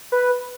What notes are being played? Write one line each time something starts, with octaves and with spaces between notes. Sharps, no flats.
B4